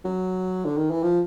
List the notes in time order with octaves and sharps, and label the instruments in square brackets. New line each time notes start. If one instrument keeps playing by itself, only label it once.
[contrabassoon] F#3
D3
D#3
E3
F3